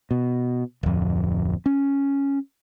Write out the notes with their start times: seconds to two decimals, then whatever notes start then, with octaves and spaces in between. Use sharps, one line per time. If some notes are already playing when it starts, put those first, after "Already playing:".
0.11 B2
0.83 D1 F2
1.66 C#4